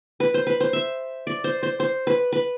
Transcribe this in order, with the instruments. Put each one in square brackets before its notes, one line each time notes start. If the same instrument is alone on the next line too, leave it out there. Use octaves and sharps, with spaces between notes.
[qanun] B4
C5
B4
C5
E5
D5
C5
C5
C5
B4
B4